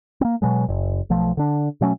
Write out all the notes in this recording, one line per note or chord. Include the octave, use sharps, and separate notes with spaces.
A#3 C4
B2 F#3 G#3
F#1
B1 F3 A3
D3 D4
B2 F#3 A3 C#4